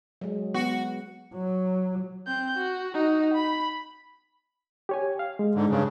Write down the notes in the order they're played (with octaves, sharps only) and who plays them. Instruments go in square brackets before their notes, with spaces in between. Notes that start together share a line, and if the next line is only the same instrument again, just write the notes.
[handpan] F#3 G#3
[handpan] B3 [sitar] F#4
[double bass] F#3
[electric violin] C4 G6
F#4
D#4 F#4
B5
[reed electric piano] G4 C#5 G#5
F5
G#3
[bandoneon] G#2 D3
G2 C#3